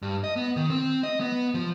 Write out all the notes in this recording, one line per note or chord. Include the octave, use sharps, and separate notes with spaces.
G2
D#5
B3
D#3
C4
D#5
B3
F3